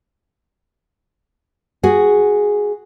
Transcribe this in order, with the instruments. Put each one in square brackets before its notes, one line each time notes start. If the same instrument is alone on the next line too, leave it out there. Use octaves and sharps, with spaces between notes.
[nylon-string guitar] F#4 G#4